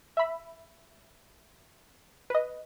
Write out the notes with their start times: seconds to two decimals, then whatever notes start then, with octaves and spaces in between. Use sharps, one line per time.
0.17 E5 B5
2.30 B4 D#5